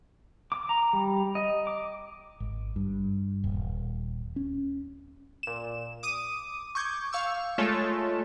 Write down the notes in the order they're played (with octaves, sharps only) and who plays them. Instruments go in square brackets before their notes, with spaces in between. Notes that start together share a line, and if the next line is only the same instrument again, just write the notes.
[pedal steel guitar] D6
A#5
G3
D#5
D6
[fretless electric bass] G#1
G2
D#1
C#4
[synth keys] A#2 E7
D6 D#6 D#7
C#6 D6 G6 G#6
F5 C#6 E6
G#3 A3 F4 A4 C#5 E7